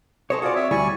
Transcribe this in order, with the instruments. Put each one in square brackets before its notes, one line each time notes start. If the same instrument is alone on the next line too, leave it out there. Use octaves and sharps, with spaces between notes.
[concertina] G#4 D#5 [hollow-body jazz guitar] A4 C5 C#5
[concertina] F4 G#4 [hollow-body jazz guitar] F#4 D5
[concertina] C4 C#5 E5
[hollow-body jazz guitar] D2 G3 E4 [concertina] D5 G#5 C#6